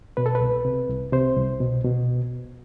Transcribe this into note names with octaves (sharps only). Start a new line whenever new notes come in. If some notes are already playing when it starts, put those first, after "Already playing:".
B2 B4
A4
B4
C2
C3
C2
C3 C5
C2
B2
B2